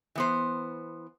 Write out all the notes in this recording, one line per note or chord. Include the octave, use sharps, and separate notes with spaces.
E3 B3 C5